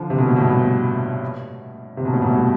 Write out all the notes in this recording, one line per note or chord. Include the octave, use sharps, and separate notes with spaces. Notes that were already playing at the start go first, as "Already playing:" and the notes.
Already playing: D3 F3
C3
B2
A2
G2 B2
A2
C3
B2
A2
G2 B2
A2